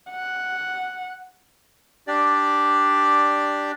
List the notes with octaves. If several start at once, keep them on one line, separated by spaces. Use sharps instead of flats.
F#5
D4 G4 D5